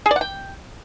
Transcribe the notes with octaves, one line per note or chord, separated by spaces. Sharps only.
G#4
D5
F#5
G5